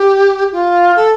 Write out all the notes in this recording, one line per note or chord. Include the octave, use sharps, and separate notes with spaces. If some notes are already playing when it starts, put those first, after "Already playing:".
Already playing: G4
F4
A4